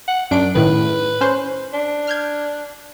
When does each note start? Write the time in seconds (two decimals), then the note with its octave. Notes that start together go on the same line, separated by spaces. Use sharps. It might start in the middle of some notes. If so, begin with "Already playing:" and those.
0.08 F#5
0.31 F#2 D4 D7
0.55 A2 D#3 B4
1.21 C#4 C5
1.73 D4
2.07 F6 G6 G#6